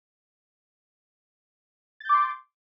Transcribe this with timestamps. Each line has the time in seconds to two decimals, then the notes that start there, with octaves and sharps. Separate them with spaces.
2.00 A6
2.05 G6
2.09 D6
2.14 C6